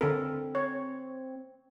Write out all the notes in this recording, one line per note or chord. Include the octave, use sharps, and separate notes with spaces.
D3 C4 A4 A#4
C#5